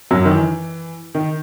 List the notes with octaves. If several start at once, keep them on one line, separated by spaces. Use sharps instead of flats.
F#2 F#3
D#3
E3
D#3